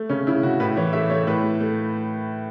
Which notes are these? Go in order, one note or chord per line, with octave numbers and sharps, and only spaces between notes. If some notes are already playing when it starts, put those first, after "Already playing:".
Already playing: A3
C#3 C#4
C#3 E4
C#3 F#4
A2 B4
E3 C#5
A3 E5
A3 C#5
A2 B4
A3
A3